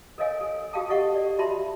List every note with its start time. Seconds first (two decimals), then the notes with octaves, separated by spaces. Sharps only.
0.18 A4 A#4 C#5 D#5 F5 G#5
0.41 A4
0.73 F#4 G#4 F5 G5 A5 D#6
0.89 G4 A4 D#5 F5 F#5 C#6
1.15 D5
1.39 F#4 E5 A5 B5 C6